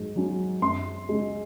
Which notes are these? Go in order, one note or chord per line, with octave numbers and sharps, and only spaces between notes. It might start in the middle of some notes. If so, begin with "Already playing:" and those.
Already playing: G#2 F#3
F#3 C#4
F#2 C6
C#3 G#3